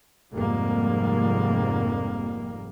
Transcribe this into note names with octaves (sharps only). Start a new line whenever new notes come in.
F1 F2 G#2 G3 A#3